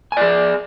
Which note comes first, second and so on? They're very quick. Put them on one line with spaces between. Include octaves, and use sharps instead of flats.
G#5 D5 G#4